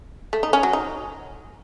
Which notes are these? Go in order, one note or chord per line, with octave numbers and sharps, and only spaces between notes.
A3
D#4
C#4
F#3
D#4